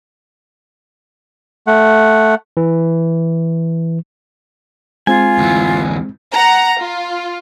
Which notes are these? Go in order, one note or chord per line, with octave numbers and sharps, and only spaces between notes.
A3 F#5
E3
G#3 C4 F4 G#5
D2 E3
F#5 A#5
F4